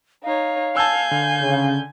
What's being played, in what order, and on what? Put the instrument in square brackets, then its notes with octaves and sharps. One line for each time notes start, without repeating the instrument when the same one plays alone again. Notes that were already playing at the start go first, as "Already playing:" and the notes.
[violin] D#4 C#5 [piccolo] F5
[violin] G#5 G6 [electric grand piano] A5 E6
[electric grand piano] D3
[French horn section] C#3